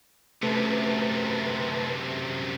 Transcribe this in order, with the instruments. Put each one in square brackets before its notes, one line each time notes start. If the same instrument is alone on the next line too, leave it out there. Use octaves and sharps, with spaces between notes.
[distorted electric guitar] F#2 C3 [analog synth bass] A3 [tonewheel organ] B4 A5